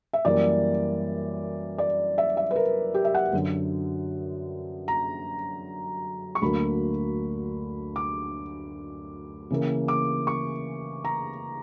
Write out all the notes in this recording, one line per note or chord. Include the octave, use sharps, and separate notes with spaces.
E5
F#2 E3 G3 A#3 D5
D5
E5
E5
B4
A#4
G4
E5
F#5
F#2 D3 F#3
A#5
C#6
D2 D3 F#3 A#3 B5
D6
C#3 E3 A#3
D6
C#6
A#5